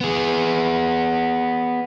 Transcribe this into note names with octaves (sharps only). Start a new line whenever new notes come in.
B3 G#4